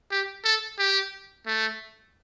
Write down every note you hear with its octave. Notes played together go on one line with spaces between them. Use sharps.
G4
A4
G4
A3